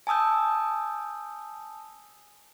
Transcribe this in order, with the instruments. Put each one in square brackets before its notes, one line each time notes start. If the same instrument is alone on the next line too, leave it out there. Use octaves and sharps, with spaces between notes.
[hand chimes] G#5 A5 D#6 E6 G6